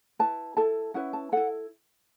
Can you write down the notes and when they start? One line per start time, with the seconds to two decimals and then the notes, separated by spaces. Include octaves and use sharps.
0.19 E4 B4 A5
0.57 E4 A4 A5
0.94 C#4 E4 B4 F#5
1.13 A5
1.32 E4 A4 F#5